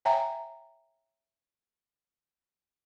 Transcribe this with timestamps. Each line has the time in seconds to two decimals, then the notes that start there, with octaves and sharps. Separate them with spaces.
0.05 C#5 E5 G5 G#5 A#5